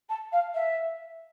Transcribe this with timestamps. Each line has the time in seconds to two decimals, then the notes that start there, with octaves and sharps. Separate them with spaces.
0.09 A5
0.32 F5
0.54 E5